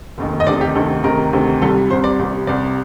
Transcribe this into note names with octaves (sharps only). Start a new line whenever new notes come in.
F1 D#2 D#3
D#5
D2 C3 D#3 D5
G4
D2 C3 D#3 A4
D2 C3 D#3 A#4
D2 C3 D#3
C2 C3 G3 A4
C2 C3 G3 C5
D5
C2 C3 G3
C2 C3 G3 D5